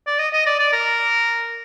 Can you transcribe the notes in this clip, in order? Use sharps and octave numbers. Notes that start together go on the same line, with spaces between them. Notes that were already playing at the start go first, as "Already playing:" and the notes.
D5
D#5
D#5
D5
D5
A#4